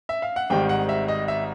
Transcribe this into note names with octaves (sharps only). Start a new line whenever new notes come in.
E5
F5
F#5
G#1 G#2 D#3 G3 G5
F#5
E5
D#5
E5